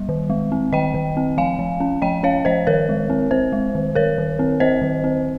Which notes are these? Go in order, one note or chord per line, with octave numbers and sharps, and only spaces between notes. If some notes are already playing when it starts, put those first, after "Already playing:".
Already playing: G3
D#3
G#3
C4
D#3 D#5 G5
D#3
C4
F3 F5 G#5
F3
C#4
F3 D#5 G5
C#4 C#5 F5
F3 C5 D#5
D#3 A#4 C#5
G#3
C4
C4 C5
G#3
D#3
D#3 A#4 C#5
D#3
C4
C4 C5 D#5
D#3
C4